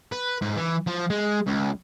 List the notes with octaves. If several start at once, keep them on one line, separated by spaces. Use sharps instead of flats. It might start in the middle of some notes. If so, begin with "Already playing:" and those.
B4
G#2
E3
F3
G#3
C#2